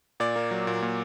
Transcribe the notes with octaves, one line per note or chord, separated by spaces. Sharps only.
A#2 D5
A#3
F#3
A#2
A#2